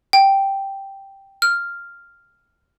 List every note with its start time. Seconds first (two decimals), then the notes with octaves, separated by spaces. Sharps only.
0.13 G5
1.42 F6